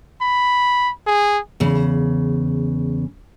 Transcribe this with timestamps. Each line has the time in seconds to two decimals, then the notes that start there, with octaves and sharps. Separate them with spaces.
0.21 B5
1.07 G#4
1.60 E2 C#3